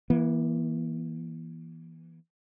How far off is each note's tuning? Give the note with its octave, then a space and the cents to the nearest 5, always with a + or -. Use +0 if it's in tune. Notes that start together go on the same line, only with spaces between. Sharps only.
E3 +0 A#3 +40